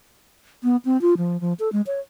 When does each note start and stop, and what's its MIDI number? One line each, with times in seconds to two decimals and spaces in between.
0.63 0.77 59
0.85 1.00 60
1.01 1.14 65
1.17 1.40 53
1.41 1.53 53
1.59 1.71 69
1.72 1.81 56
1.87 2.00 73